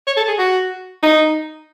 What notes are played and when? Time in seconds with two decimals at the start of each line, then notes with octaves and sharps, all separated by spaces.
0.07 C#5
0.17 A4
0.28 G#4
0.38 F#4
1.02 D#4